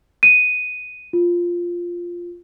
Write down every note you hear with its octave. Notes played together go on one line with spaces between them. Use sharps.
D#7
F4